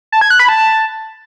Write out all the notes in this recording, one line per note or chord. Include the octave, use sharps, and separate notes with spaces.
A5
G#6
F#6
B5
A5